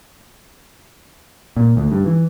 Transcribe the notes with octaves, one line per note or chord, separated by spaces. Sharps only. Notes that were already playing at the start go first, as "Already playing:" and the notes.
A#2
D2
G2
E3